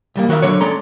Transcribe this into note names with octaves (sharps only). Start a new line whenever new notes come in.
C2 G3 A#3
D#3 F#4 A#4 E5 F5
D3 F#3 C#5
G#3 C#4 A4 D5 A#5 C6